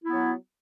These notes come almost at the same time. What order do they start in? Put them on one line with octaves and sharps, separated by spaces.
E4 B3 F#3